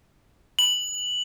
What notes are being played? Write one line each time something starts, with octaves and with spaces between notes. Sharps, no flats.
F#7